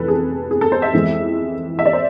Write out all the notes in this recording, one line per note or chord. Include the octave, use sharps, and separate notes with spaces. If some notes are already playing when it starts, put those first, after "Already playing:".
Already playing: F1 F2 C3 E3 A4 B4
G#4
G#4
A4
C5
E5
F2 E3 G#3
E5
D5
C5